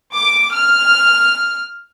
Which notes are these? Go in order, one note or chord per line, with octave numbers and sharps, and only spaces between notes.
D6
F6